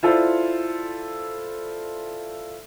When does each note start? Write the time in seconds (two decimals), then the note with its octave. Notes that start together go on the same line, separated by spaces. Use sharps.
0.03 E4 F4 A4 C5 D5